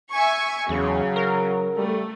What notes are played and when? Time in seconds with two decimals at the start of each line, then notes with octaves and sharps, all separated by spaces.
0.12 E5 G#5 C#6
0.69 E2 C#3 F#3
1.16 A#4
1.77 G3 A3